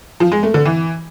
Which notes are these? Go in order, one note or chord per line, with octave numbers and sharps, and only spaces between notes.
F3
G#3
A3
D3
E3